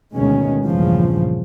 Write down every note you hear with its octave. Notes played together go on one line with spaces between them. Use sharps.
D2 B2 D#3 G#3 C#4
A#1 E2 G2 C#3 F3